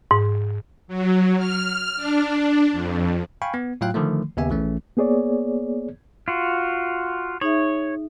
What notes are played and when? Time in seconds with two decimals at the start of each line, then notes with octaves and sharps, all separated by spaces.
0.11 G#2
0.88 F#3
1.38 F6
1.97 D4
2.72 F2
3.42 F5 G5 G#5 B5 C#6
3.54 B3
3.81 A2 F#3 F4 F5 G5 F#6
3.94 D3 D#3 F3 A3
4.37 D#2 C#3 B3 G4 E5 G#5
4.50 A#1 E3 A3 C#4
4.97 A#3 B3 G#4 C#5 D5
6.28 F4 F#4
7.41 D#4 G#4 C#5 E5